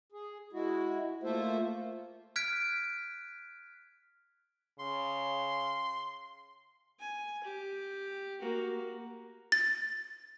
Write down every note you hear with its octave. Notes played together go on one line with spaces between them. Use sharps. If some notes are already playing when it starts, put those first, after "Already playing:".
G#4
G#3 E4 F#4
A3 A#3 F4 A4 C5 E5
F6 F#6 G#6 B6 D7
C#3 C6
G#5
G4
A#3 F#4
A6